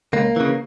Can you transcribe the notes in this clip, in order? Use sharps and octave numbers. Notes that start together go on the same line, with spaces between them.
C#2 A#3
C#3 E3